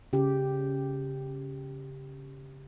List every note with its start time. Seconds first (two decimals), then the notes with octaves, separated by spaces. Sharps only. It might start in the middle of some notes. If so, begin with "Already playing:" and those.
0.13 C#3 G4